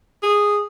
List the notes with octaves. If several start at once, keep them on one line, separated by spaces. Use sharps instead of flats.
G#4